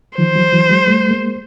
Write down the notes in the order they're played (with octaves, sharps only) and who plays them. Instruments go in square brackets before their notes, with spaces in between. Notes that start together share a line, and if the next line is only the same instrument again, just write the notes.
[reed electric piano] D#3 F3 [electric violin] C5
[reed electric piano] E3 F#3
E3 F#3
F#3 G#3
G3 A3
G#3 A#3